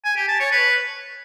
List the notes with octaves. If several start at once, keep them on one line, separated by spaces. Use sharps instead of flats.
G#5
G4
A5
C#5
B4